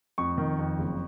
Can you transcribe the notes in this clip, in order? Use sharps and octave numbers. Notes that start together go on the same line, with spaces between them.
F2 C#6
D#3
F2
F#1